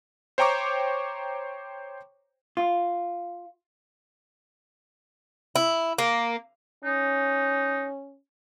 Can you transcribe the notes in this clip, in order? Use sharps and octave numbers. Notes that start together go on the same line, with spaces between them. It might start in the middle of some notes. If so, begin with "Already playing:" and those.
C5 C#5 G5 A#5 C#6 D6
F4
E4
A#3
C#4 D#4